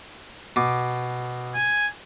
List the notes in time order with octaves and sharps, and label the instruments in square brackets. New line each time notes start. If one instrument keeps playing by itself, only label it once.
[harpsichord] B2 D6
[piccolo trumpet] G#5